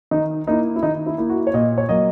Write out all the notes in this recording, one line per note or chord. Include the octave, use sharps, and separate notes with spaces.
D#3 D#4
A#3 D#4 E4
E4
D#3 D#4
E4
A#3 E4
F#4
C#5
A#2 D#5
C#5
F#3 A#3 D#5